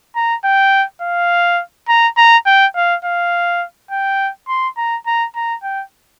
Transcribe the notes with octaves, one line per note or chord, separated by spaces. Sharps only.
A#5
G5
F5
A#5
A#5
G5
F5
F5
G5
C6
A#5
A#5
A#5
G5